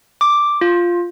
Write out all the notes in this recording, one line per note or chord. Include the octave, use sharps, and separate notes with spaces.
D6
F4